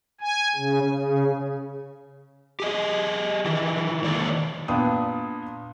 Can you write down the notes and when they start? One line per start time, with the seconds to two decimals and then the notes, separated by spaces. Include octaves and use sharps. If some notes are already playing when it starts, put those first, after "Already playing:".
0.21 G#5
0.56 C#3
0.91 C#3
2.60 G4 G#4 D#5
3.45 D#3 E3
4.04 D#3 G#3 A#3 A4 C#5 D5
4.68 A#2 B3 D4 G5 D#6